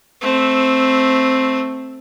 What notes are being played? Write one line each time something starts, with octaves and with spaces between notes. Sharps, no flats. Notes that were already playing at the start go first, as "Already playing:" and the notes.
A3 C4